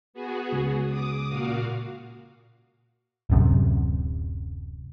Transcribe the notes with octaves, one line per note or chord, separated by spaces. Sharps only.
B3 F#4 G#4
C#2
D6 D#6
A#2 F#4 F5
D1 F#2 C3